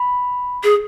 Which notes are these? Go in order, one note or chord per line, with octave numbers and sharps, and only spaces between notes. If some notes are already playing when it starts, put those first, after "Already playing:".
Already playing: B5
G#4